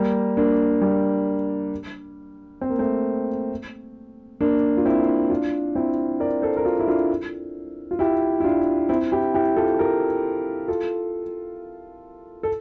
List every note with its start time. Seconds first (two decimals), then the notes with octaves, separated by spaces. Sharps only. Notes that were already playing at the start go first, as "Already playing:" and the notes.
Already playing: G3 A#3
0.37 A#3 D4
0.82 G3 A#3
2.61 C4
2.70 A#3
2.79 A3 C4
4.41 A#3 D4
4.77 F4
4.85 C4 E4
5.30 D4 F4
5.75 C4 E4
6.20 A#4 D5
6.42 A4 C5
6.57 A#4
6.64 F4 A4
6.80 E4
6.87 D4 F4
7.91 F4
7.99 E4 G4
8.40 E4
8.44 D4 F4
8.89 C4 E4
9.12 E4 G4
9.34 E4 G4
9.56 F4 A4
9.79 G4 A#4
10.68 F4 A4
12.43 A4